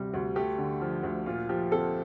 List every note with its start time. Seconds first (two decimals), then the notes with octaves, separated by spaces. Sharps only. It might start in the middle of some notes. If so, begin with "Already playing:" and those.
Already playing: D2 C3 G3
0.14 D2
0.36 A3 G4
0.58 D3
0.81 F3
1.03 D2
1.26 A#2 F4
1.49 F3 G4
1.71 C4 A4